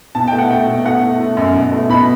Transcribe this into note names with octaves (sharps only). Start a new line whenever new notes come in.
B2 A5
A3 G5
F#5
A3 G5
B2
A3 F#5
A3
A3
F#2
B2
A3
B2 B5